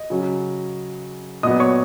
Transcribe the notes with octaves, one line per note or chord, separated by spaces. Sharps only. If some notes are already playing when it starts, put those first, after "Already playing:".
Already playing: D#5
C#3 F#3 C#4
A#2 F#3 B3 D#5 D#6
C#5 C#6